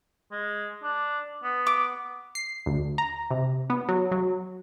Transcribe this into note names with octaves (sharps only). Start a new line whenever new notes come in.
G#3
D4
B3
D6
C7
D2
A#5
C3
B3
F#3
F#3